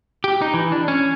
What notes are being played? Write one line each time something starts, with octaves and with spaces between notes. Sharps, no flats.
G4
D#4
E3
D4
C#4